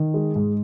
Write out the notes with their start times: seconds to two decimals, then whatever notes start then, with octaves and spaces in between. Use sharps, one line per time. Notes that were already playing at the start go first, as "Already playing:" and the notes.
Already playing: D#3
0.14 G#3
0.36 G#2